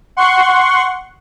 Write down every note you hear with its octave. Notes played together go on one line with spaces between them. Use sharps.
F#5 C6 C#6